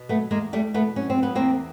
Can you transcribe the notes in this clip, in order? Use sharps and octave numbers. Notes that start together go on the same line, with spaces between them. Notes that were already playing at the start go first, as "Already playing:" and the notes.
Already playing: B2
F#3 A3 B3
E2 G#3 A#3
E2 G3 A3
B2 A3 B3
F#3 C#4
C4
E2
B3
E2 A#3 C4